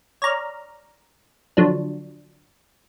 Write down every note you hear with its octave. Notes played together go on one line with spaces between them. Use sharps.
C#5 D5 A#5 F6
D3 F3 F#3 D4